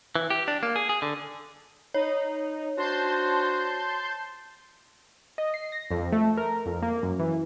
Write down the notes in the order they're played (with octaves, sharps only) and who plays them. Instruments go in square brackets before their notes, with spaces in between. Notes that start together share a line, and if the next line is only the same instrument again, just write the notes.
[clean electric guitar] E3
G4
D4
A#3
G#4
G#4
D3
[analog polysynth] D#4 [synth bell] C#5
[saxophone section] D4 F#4 C5 [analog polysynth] A5 C6 G6
[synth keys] D#5
C7
A#6
F2
A3
A#4
F2
A#3
F#2
E3